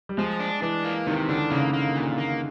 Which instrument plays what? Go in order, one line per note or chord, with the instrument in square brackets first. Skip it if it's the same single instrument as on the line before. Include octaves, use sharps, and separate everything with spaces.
[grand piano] G3
[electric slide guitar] F3 [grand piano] G#3
[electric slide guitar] D4
[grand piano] E3 [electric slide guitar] D4
[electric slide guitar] A#3
[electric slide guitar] C3 [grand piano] D#3
[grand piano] D3 [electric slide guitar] D4
[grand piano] C#3 [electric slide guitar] A#3
[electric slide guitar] A#3
A#2
A#3